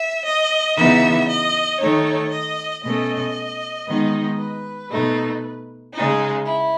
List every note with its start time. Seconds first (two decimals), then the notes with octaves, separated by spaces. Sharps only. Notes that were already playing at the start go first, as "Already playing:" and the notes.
Already playing: E5
0.25 D#5
0.76 C#3 E3 B3 D#4 E5
1.28 D#5
1.80 D#3 A3 D#4 C#5
2.31 D#5
2.83 B2 A3 C#4 D#5
3.87 D#3 G#3 B3 D#4
4.39 B4
4.91 B2 A3 D#4
5.94 C#3 G#3 D#4
6.46 E4